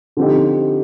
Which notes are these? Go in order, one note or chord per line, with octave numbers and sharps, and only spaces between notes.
D3 F3 C4 D#4 G4